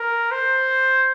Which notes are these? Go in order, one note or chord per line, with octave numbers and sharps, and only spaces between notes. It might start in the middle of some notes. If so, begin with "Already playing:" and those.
Already playing: A#4
C5